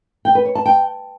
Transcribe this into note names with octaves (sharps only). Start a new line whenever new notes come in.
G5
B4
C#5
A5
G5